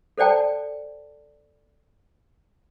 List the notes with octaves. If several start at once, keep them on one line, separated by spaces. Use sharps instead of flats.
A4 C5 D5 G5 A5